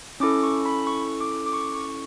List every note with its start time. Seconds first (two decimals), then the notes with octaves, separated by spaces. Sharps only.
0.20 C#4 E4 A4 D6
0.43 C#6
0.66 B5
0.87 C#6
1.21 D6
1.46 D6
1.53 C#6
1.75 C#6